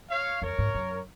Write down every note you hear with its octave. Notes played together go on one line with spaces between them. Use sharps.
C#5 F5
F2 A#4 C#5
G#2
F#2